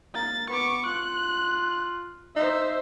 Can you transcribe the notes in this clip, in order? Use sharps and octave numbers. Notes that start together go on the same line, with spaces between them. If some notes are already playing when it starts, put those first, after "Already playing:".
A#3 A6
B3 C#6 D6
F4 F#6
D#4 C5 E5